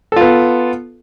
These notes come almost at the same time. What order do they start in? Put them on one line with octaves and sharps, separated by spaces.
A4 F4 B3